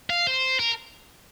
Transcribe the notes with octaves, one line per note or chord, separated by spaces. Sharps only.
F5
C5
A#4